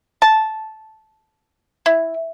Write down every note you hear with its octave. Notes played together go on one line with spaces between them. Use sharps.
A5
E4